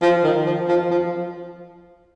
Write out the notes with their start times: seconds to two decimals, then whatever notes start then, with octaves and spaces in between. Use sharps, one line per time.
0.02 F3
0.24 D#3
0.46 F3
0.68 F3
0.90 F3